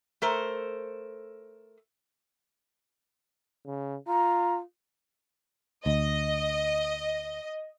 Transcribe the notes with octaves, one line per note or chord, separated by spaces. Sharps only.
A3 A#4 C5
C#3
F4 A#5
D2 D#5